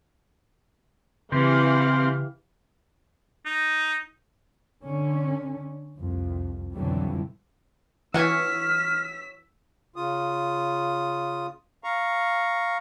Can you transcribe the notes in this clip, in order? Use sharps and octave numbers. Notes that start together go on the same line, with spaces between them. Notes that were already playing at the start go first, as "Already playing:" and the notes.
C#3 E3 C4 G4 F5
D#4
D3 C#4
C2 F2
F2 B2 D3 E3 F#3 G3
E3 C#4 F#4 E6 F6 G#6 B6
C#3 F4 D#6
F5 A#5 C#6